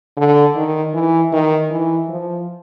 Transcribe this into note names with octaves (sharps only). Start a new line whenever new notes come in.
D3
D#3
E3
D#3
E3
F3